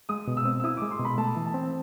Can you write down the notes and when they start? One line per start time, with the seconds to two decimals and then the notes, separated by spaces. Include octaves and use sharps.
0.09 G#3 D#6
0.28 B2
0.37 E6
0.45 C4
0.60 E6
0.64 E4 D#6
0.77 G#3 D6
0.91 C6
0.99 B2
1.05 B5
1.18 A3 A5
1.36 E3
1.45 A5
1.54 C4